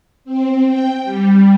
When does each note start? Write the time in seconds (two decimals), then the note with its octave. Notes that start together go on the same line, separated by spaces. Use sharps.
0.25 C4
0.65 G5
1.04 G3